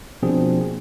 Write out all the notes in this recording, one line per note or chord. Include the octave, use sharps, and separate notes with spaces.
B2 F3 A#3 C4 D4 G#4